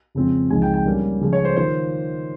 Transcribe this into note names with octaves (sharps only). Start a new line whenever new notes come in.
F2 C#3 G#3 C4 F4
C#2 C#3 F3 G#3 D#4 G#5
G5
G5
A#2 G3 A#3 C#4
C#3 F3 G#3 C#4
C#5
C5
D#3 A#3 F4 C5